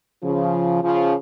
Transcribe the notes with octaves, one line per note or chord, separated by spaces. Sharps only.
C#3 F3
C#3 F3